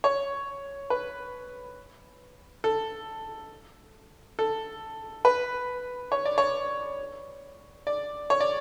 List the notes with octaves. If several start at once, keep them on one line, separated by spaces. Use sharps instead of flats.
C#5
B4
A4
A4
B4
C#5
D5
C#5
D5
C#5
D5